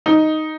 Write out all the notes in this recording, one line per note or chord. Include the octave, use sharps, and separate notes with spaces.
D#4